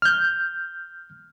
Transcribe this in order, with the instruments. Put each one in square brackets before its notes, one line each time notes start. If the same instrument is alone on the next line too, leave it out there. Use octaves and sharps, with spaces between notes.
[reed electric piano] F6 G6